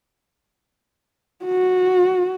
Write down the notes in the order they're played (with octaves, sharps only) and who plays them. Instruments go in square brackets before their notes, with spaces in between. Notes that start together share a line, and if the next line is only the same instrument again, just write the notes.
[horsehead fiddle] F#4